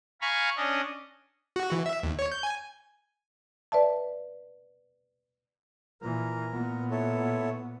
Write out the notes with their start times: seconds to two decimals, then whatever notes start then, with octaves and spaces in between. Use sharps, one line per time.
0.22 F5 G#5 A#5 B5 C#6
0.57 C#4 D4 D#5
1.56 F#4
1.72 E3
1.86 E5
2.03 D#2
2.19 C#5
2.32 G6
2.43 G#5
3.72 B4 D5 E5 A5
6.02 A#2 E3 A#4
6.52 A#2 B3
6.91 E4 A4 C#5